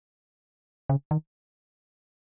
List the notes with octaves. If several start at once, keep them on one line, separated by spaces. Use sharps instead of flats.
C#3
D#3